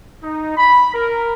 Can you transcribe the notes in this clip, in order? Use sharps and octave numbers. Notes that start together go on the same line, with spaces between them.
D#4
B5
A#4